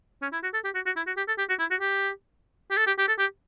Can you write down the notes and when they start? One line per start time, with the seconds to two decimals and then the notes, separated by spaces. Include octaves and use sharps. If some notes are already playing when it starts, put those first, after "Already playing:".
0.22 C#4
0.33 E4
0.43 F#4
0.54 A4
0.64 G4
0.75 F#4
0.86 F#4
0.96 E4
1.07 F#4
1.17 G4
1.28 A4
1.38 G4
1.49 F#4
1.60 E4
1.71 F#4
1.81 G4
2.71 G4
2.77 A4
2.87 G4
2.98 G4
3.08 A4
3.19 G4